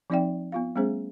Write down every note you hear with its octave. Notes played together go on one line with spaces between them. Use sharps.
F3 C4 D#4 D5 E5 G5
B3 F4 F5
G3 A3 B3 C#4 G#4 C5